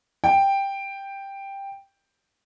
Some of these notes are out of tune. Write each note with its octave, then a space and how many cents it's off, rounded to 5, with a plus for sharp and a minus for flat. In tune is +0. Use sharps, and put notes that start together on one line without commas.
G5 +5